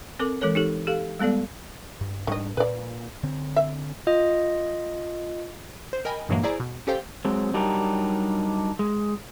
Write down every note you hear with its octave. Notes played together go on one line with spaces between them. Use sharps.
C4 A4 A#4 D6
E3 G#3 A4 A#4 C#5
D#4 G4 A4
G4 A4 F5
G3 G#3 B3 A4 D5
G2
G#2 D#3 G3 D4 D#5
A#2 B4 D5
D3 C4
E5
F4 D#5
C5
A#4 D#5 G5 G#5 B5
G2 A#2 E3 F#3 G#3 A#3
E4 G#4 C5 D5 G#5 A#5
B2
C#4 G4 A4 C5 F5 G5
F#3 G#3 C4
F#3 G3 D4 D#4 G4 A#4
G#3